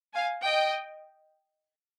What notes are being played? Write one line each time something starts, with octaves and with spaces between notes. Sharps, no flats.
F5 G#5
D#5 G5